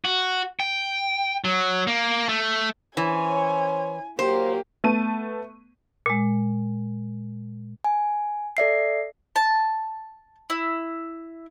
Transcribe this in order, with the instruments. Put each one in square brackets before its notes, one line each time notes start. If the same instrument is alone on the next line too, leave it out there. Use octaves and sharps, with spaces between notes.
[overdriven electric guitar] F#4
G5
F#3
A#3
A3
[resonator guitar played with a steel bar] E3 [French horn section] C#4 C5 C#5 [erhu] G#5
[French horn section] A#2 F#3 A#3 [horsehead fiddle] G4 [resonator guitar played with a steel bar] C5
[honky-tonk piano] A3 B3 A5 D#7
[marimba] A#2 G#3
[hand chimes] G#5
A4 D5 E5 C7
[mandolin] A5
E4